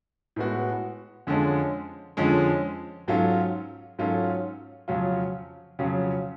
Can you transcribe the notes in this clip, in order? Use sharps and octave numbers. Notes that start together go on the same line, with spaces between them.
A2 G#3 B3 F#4
F2 D3 F3 G#3 C#4
F2 D3 F3 G#3 C#4
G#2 F#3 C#4 F4 A4
G#2 F#3 C#4 F4 A4
F2 C#3 F#3 C#4 F4
F2 C#3 F#3 C#4 F4